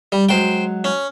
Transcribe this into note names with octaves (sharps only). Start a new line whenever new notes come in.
G3
F#3 G#3 C5 G5
C#4